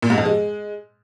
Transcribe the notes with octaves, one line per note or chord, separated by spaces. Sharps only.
A#2
G#2
F2
G#3